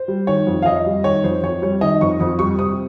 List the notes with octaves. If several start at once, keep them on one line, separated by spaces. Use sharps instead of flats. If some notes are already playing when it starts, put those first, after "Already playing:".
Already playing: C5
G3
D#3 C#5
F2
F5
F2 D#5
G3
D#3 C#5
F2 C5
F2 C#5
G3 C#5
D#3 D#5
F2 C#6
F2 D#6
G3 C#6
C3 D#6